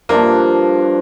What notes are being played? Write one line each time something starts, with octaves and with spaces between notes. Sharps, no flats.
G2 F3 A#3 D4